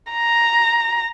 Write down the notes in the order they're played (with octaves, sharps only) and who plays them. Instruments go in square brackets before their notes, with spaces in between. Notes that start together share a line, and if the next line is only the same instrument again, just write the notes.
[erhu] A#5